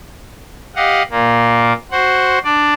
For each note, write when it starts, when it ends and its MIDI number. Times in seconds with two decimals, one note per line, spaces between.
0.76 1.02 67
0.76 1.02 75
0.76 1.02 77
0.76 1.02 78
1.11 1.73 46
1.11 1.73 58
1.91 2.39 66
1.91 2.39 72
1.91 2.39 78
2.44 2.74 62
2.44 2.74 74